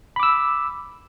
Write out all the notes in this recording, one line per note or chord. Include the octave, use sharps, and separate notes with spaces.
B5 D6 E6